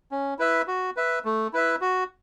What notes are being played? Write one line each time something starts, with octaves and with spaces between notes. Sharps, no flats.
C#4
E4 B4 E5
F#4
B4 E5
A3
E4 B4 E5
F#4